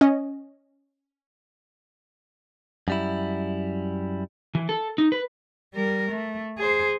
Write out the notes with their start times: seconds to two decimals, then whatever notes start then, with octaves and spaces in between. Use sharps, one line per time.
0.01 C#4 D#5
2.88 F#2 G3 E4
4.55 E3
4.69 A4
4.98 D#4
5.12 B4
5.74 G3 A#4
6.11 A3
6.58 G#4 C5